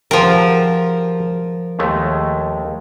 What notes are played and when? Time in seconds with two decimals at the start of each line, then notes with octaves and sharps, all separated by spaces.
0.11 F3 G4 G#4 A#4 F#5
1.79 D#2 G#3 A3